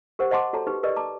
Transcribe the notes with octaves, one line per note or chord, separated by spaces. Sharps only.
G4 A#4 C5 F#5
C5 D#5 F#5 A5 C6 D6
F#4 A4 C#5 A5 A#5
D#4 G4 B4
G4 A#4 B4 D5 D#5
A5 A#5 D6